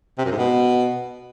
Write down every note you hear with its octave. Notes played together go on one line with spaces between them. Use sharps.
C3
F#2
G#2
B2